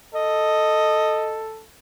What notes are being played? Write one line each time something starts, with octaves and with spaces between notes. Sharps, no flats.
A4 D#5